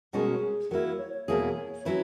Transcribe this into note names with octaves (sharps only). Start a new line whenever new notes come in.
B2 G#3 C#4 F#4 G#4 A#4
F#3 A#3 E4 A#4
C#5
C#5
E2 B2 A#3 E4 G#4
F#3 C#4 E4 B4